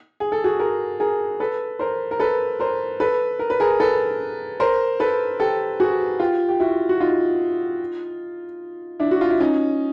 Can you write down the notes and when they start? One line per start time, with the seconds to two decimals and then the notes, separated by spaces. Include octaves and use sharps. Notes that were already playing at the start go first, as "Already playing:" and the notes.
0.20 G#4
0.32 A4
0.44 F#4 G#4
0.60 G#4 A#4
1.00 G#4 A#4
1.40 A4 B4
1.79 A#4 C5
2.11 A#4
2.20 A4 B4
2.60 A#4 C5
3.00 A4 B4
3.39 A#4
3.50 B4
3.60 G#4 A#4
3.80 A4 B4
4.60 A#4 C5
5.00 A4 B4
5.40 G4 A4
5.80 F#4 G#4
6.20 F4 G4
6.48 G4
6.60 E4 F#4
6.89 F#4
7.00 D#4 F4
9.00 D4 E4
9.11 F#4
9.21 F4
9.30 E4
9.40 C#4 D#4